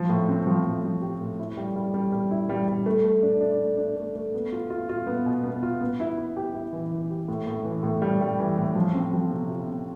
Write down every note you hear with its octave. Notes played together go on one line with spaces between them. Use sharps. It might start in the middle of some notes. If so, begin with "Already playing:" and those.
Already playing: F3
A2
C4
F3
A2
F3
G4
A2
E4
G3
G3
G3
G3
E4
G3
G3
A3
A3
D4
D4
A3
D4
A3
A3
B3
F4
F4
F4
B3
B2
B3
F4
B3
E4
E4
G4
E4
E3
E3
G4
A2
A2
E3
A2
G3
G3
E3
A2
F3
C4
F3
C3
F4
C3